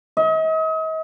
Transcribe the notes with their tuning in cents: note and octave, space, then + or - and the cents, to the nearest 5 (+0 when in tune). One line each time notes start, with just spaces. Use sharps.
D#5 +40